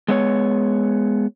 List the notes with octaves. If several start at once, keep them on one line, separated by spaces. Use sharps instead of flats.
G#3 B3 C#5